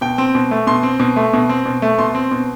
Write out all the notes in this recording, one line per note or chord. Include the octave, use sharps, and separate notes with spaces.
B2 G5
C4
B2
A3
B2 C6
C4
B2
A3
B2
C4
B2
A3
B2 C6
C4
B2